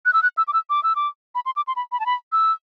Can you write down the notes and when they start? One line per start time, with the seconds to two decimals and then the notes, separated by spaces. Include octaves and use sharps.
0.06 F#6
0.13 E6
0.23 F#6
0.37 E6
0.48 D6
0.53 E6
0.70 D6
0.83 E6
0.96 D6
1.35 B5
1.46 C6
1.56 D6
1.67 C6
1.76 B5
1.92 B5
2.00 A5
2.06 B5
2.32 E6